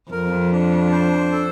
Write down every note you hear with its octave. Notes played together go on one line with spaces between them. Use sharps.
F2 A#4
D4
C5
A4